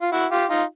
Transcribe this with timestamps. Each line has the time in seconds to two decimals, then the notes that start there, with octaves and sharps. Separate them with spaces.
0.02 F4
0.12 E4 F#4
0.31 F4 G4
0.50 D#4 F4